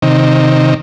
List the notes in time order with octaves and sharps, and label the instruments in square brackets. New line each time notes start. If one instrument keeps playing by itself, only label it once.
[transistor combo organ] C3 D#3